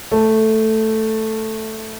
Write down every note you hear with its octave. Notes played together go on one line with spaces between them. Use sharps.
A3